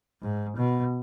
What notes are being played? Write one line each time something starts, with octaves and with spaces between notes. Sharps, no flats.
G#2
B2